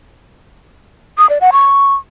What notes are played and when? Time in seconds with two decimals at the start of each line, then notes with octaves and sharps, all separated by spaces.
1.18 D#6
1.30 D5
1.41 F#5
1.53 C#6